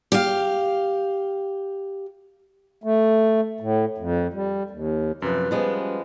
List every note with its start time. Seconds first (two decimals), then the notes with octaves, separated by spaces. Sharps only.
0.12 G4 F5
2.84 A3
3.60 A2
3.98 F2
4.33 G3
4.71 D#2
5.22 F#2 C3 F3 B4
5.51 F3 G3 G#3 B3 C#4